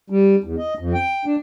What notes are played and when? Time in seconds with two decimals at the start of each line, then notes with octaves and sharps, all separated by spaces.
0.10 G3
0.44 E2
0.58 D#5
0.79 F2
0.94 G5
1.25 D4